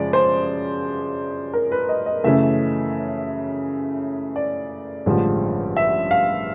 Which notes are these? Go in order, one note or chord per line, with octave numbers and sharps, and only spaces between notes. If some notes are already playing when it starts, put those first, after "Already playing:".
Already playing: F#2 C#3 F3 G#3 D5
C5
A#4
B4
D#5
D#5
F#2 C#3 E3 A3 E5
D5
A1 G2 D3 F3 G#3
E5
F5